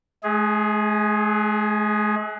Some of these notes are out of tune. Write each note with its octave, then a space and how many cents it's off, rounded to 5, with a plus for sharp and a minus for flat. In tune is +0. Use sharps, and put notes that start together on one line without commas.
G#3 +45 G#4 +0